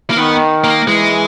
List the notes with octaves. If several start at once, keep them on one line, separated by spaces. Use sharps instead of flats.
A#3
D#3 B3
A#3
E3 G#3